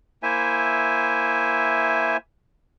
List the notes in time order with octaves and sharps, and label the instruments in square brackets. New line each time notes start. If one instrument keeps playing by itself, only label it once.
[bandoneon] A#3 E4 C5 E5 G#5